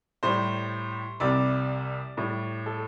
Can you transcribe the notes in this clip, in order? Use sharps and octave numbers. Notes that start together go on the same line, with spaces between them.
A2 G3 C5
C2 C3 G3 D5
A2 G3
A4